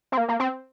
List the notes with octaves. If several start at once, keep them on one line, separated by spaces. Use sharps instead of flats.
C4
A#3
A#3
C4